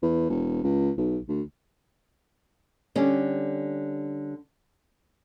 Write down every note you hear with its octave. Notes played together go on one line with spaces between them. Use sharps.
E2
E1
C#2
B1
D2
D3 G3 C#4